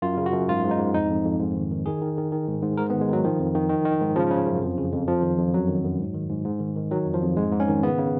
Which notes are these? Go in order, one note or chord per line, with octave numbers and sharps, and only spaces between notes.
F#2 F4
C#3
F#4
F#2
G#2 F4
G#2
D#4
G#2
F2 D#4
F2
F2
G#2
D#3
D#3
D#3 G#4
D#3
D#3
D#3
G#2
G#2
G#2 A#4
B3
D#3
G#3
D#3 F#3
D#3 F3
F2
D#3
D#3
D#3
G#2
C#3 F3
C#3
F#2
F2
C#3
F2
F2 F3
D#3
F2
F#2 F#3
D#3
F#2
G#2
D#3
G#2
G#2
D#3
D#3
D#3 F#3
F2
F3
F2
G#2 G#3
G#2
C#4
D#3
C#3 B3
C#3